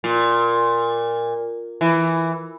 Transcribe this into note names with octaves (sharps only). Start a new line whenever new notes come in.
A#2
E3